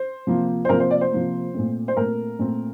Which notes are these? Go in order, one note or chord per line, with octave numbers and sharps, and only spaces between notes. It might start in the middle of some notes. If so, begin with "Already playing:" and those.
Already playing: C5
C3 F3 A#3
C5
C3 F3 A#3 A#4
C5
D5
C5
C3 F3 A#3
A#2 A3 C4
C5
A#2 A3 C4 A#4
A#2 A3 C4